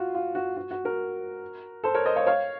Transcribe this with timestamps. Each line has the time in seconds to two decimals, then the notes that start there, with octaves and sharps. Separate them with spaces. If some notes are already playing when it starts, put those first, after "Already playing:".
Already playing: F4 F#4
0.15 F4
0.35 F#4
0.57 F#4
0.71 F#4
0.85 F#4 A#4
1.84 A4 C5
1.95 A#4 C#5
2.06 C5 D#5
2.16 C#5 F5
2.27 C#5 F5